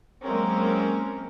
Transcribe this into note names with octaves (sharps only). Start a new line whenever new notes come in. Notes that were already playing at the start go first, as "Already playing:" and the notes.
F#3 G#3 A#3 C4 C#4 A#4